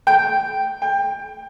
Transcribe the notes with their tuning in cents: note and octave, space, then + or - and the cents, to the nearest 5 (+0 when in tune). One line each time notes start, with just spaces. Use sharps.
G5 -5
G5 +20